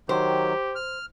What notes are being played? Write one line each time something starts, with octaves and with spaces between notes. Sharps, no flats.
D#3 F#3 G4 C5
F6